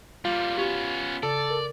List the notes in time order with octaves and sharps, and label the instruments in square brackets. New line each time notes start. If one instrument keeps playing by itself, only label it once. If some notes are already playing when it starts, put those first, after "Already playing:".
[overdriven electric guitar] G3 A#3 [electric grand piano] F4
[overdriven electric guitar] B3 C#4 [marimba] F#4 G4 C#6
[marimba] C#3 [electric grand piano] A4 [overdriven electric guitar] D5
[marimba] A#4